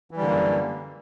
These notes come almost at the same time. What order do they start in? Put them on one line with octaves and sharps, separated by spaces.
E3 G3 D3 A#3 F#2